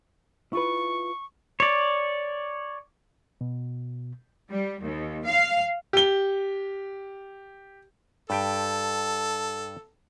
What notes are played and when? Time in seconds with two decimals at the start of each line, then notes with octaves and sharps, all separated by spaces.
0.53 E4 F4 B4 C#6
1.60 C#5 D5
3.41 B2
4.49 G3
4.81 D#2
5.26 F5
5.93 G4 G7
8.30 G2 G4 A4 G5